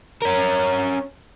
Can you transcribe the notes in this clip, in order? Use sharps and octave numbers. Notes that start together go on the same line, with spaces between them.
C#4 A#4